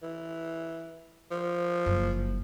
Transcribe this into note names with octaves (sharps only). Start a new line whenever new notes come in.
E3
F3
F#1